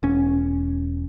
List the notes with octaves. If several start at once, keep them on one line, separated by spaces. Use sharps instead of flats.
E1 C#4